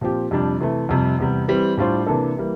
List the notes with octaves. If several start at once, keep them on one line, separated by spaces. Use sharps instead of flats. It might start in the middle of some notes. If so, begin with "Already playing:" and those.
A#2 F3 C4 G4
F2 C3 G3 D4
C3 E3 A3
F2 C3 G3
E2 C3 G3
E3 G3 C4
A2 G3 D4 F4 C5
C3 E3 A#3 D4 A4
E3 G3 A#3